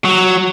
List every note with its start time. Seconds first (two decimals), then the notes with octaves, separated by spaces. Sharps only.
0.05 F#3